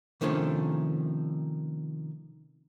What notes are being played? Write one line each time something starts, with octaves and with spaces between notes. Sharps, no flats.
C3 D#3 F3 A3 C#4 D4